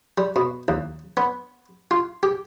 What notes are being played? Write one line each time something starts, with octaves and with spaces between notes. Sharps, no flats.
G3
B2
D#2
B3
F4
G4